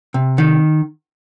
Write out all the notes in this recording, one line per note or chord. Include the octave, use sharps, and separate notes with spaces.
C3
D#3